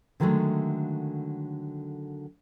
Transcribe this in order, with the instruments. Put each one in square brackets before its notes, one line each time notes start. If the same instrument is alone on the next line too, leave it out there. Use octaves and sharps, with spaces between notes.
[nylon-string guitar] D3 D#3 F#3 G#3 A3